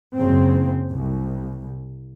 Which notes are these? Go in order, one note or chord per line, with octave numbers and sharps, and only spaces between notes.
F#1 C#3 C4
C2